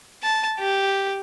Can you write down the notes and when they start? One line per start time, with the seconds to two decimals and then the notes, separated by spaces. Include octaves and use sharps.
0.23 A5
0.59 G4